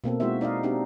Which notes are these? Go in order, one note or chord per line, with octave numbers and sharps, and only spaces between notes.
B2 A#3 C4 A4
G#3 D#4 E4 F#4 C5 E5
D#4 D5 D#5 F5
C4 D4 D#4 G4